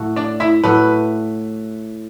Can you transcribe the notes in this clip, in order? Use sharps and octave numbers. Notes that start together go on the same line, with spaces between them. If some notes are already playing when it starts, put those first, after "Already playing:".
Already playing: A2 A3 F#4
D4 D5
E4 E5
A2 A3 F#4 B4